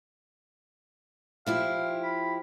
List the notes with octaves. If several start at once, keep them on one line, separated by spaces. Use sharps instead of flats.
F3 E4 G4 F5
B5